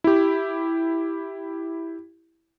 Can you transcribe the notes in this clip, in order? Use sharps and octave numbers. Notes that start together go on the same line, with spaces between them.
E4 G4